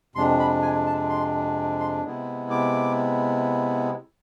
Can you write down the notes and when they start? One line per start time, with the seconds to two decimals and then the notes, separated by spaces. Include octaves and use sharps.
0.15 F2 C3 G#3 D4 C6
0.39 B5
0.62 G#5
0.86 A5
1.09 C6
1.80 C6
2.04 C3 G#3 B3 E4
2.50 D6